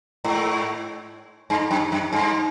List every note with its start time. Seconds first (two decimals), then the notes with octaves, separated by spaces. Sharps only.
0.24 G#2
1.50 G2
1.71 F#2
1.92 F#2
2.13 G2